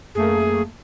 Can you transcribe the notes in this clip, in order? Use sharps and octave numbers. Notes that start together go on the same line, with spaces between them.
F#2 A3 A#3 G#4